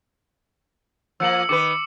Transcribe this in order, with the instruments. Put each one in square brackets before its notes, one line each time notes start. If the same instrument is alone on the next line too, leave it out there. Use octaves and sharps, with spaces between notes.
[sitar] F3 A#3 [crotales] E6 C#7 F#7
[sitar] D#3 G#4 B4 [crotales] D6 C#7